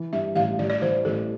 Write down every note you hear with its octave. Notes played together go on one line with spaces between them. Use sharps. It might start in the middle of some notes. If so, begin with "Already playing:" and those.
Already playing: E3
G2 E5
A1 F5
A1 D5
D5
E3 C5
A1 A4